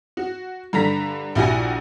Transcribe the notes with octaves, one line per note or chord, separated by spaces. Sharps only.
F#4
G2 D3 A#5 A#6 B6
A#1 E4 F#4 G4 G#5 A#6